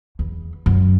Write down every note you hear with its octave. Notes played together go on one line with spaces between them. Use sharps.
E2
F#2